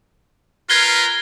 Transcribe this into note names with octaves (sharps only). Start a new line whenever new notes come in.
F4 A#4 B4 G#6 C7 G7